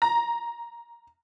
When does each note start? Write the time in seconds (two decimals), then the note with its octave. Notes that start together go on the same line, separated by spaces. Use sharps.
0.02 A#5